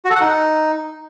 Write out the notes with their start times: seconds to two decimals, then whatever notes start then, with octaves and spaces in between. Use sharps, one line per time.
0.05 F#4
0.10 A4
0.15 F#5
0.21 D#4